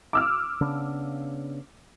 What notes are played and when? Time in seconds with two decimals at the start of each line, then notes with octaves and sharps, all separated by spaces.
0.13 D6 E6 F6
0.61 C#3 B3 D4